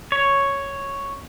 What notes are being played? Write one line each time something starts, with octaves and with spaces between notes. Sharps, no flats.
C#5